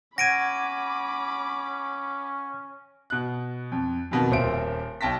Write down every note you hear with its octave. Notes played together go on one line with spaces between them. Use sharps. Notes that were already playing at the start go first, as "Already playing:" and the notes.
C#4 F#5 B5 D6 G#6 A#6 D7 D#7
B2 F#6
F2
F2 B2 D#3
D#1 A#2 C5 E5 D7
B1 G5 A5 A#6 B6